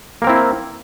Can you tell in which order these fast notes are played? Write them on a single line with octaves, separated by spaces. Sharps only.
A#3 A#4 C4 E4